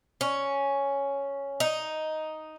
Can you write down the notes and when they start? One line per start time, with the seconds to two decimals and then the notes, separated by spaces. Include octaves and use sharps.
0.21 C#4
1.60 D#4